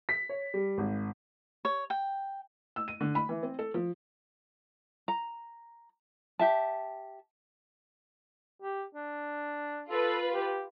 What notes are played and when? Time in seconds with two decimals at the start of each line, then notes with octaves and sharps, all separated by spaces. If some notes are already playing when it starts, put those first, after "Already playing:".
0.09 B6
0.29 C#5
0.54 G3
0.78 G#1
1.65 C#5
1.90 G5
2.76 E6
2.88 D#7
3.00 D3
3.15 B5
3.29 E3
3.43 C4
3.59 A4
3.74 F3
5.08 A#5
6.39 G4 E5 A5
8.62 G4
8.95 D4
9.90 F4 A4 B4
10.34 G4